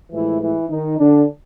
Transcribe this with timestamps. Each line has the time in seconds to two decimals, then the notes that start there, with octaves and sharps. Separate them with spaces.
0.12 A2 E3 F3 G#3 E4
0.41 E3 E4
0.70 D#3 D#4
0.99 D3 D4